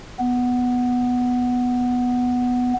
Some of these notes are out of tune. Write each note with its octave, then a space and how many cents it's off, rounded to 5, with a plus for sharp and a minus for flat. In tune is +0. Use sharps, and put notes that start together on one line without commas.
B3 +0